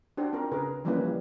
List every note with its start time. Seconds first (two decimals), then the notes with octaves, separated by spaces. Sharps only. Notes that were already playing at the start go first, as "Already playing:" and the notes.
0.17 D4 F#4 G4 C5
0.33 C4 F4 A#4
0.52 C#3 G#4 A#4 B4
0.85 E3 F3 G3 A#3 C#4 B4
1.05 G3